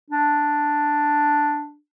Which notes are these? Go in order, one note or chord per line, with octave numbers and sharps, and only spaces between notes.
D4